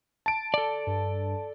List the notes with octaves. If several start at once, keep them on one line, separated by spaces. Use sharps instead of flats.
A5 D7
A4 D5
G2